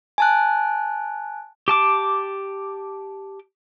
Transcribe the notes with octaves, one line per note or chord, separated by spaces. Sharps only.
G#5 A5 F#6
G4 A5 D6